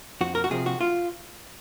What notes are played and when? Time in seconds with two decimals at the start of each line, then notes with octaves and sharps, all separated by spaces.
0.21 F2 F#4
0.35 A#4
0.44 F#4
0.51 C3 F3 G#4
0.66 F#4
0.81 F4